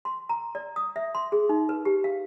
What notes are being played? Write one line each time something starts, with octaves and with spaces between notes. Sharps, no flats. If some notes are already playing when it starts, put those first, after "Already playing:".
C6
A#5
D5
D#6
E5
C6
G#4
D#4
B4
G4
F5